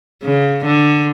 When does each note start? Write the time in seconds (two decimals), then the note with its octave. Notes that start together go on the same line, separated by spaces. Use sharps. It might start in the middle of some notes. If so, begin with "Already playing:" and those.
0.24 C#3
0.65 D3